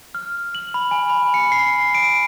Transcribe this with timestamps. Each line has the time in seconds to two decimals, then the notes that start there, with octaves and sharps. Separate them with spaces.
0.15 F6
0.55 F#7
0.74 B5
0.91 G#5
1.10 B5
1.34 C#7
1.52 C7
1.95 D7